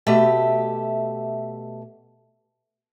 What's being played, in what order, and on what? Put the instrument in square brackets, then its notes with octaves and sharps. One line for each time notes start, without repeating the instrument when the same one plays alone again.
[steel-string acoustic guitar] B2 A3 G4 E5